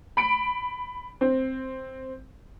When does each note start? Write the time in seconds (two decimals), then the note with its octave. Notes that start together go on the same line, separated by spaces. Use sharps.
0.17 B5 D7
1.21 C4